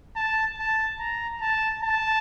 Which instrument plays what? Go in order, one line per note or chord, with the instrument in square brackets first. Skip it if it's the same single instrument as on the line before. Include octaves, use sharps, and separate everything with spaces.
[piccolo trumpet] A5
A5
A#5
A5
A5